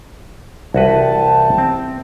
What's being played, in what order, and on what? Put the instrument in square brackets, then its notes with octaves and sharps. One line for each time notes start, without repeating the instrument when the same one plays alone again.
[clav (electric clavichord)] C2 F#4 B4 [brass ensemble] E3 G5 A5
[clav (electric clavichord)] C4